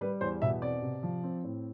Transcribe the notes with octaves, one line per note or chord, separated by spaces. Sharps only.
G3 B4
E2 C5
B2 E5
C4 D5
C3
F3
C4
A2